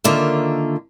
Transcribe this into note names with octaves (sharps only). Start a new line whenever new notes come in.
D3 D#3 A#3 F4 E5